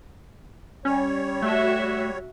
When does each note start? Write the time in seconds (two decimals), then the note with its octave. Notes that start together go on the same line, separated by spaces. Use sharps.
0.85 G3 C#4 C#5
1.42 A3 F#4 E5